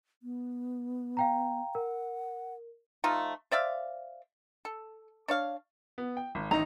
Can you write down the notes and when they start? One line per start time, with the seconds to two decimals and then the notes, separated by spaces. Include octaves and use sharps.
0.23 B3
1.17 F5 G5 A#5
1.75 A#4 F#5
3.04 F3 A3 D#4 F4
3.51 C5 D5 E5 F5
4.65 A4
5.28 D4 C#5 F5
5.98 B3
6.17 G5
6.35 G#1
6.51 A1 D#3 D#4 A#5